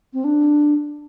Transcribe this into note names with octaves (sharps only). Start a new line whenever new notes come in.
C4
D4